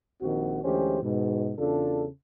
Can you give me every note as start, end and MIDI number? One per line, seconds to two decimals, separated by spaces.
0.22 0.63 34
0.22 0.63 51
0.22 0.63 60
0.22 0.63 66
0.64 1.01 38
0.64 1.01 52
0.64 1.01 56
0.64 1.01 61
0.64 1.01 67
0.64 1.01 72
1.02 1.52 44
1.02 1.52 47
1.58 2.05 40
1.58 2.05 49
1.58 2.05 62
1.58 2.05 65
1.58 2.05 69